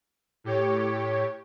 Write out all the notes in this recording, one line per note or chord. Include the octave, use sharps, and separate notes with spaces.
A2 G4 C#5